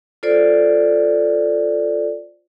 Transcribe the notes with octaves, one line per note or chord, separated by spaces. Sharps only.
F4 A4 C5 D5